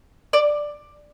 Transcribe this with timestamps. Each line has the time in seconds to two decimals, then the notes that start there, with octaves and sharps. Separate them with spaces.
0.33 D5